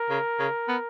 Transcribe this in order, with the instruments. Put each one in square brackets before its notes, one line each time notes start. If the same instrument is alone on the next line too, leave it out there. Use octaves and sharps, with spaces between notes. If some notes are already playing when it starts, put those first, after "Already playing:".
Already playing: [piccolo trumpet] A#4
[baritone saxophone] C#3
C#3
B3